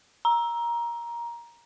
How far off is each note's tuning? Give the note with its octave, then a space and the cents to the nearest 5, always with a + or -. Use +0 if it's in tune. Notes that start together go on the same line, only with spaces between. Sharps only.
A#5 +15